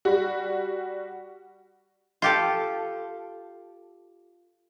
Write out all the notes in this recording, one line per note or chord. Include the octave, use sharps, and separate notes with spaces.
G3 F#4
F4 G4 A4